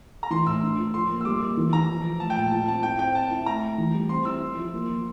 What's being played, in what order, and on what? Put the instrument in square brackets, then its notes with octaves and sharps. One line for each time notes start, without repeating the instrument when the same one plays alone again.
[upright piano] A#5
[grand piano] E3 [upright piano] C6
[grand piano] A2 [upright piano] E6
[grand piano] D4
F4
[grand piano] F3 [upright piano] C6
[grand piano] A#3
[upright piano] E6
[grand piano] G3 [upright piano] D6
[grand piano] A#3
E3
[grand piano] E3 [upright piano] A#5
[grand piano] F3
F3
[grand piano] A3 [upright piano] A5
[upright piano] G5
[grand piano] A#2 [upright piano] A5
[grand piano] F4 [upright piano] A5
[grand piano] C4 [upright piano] A5
[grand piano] E4 [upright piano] G5
[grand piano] C4 [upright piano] G5
[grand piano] C4 [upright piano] A5
[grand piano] E4
[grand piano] A3 [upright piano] A#5
[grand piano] A3
E3
G3
[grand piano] C4 [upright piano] C6
[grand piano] E4 [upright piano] E6
[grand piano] E4
F3
A#3
F3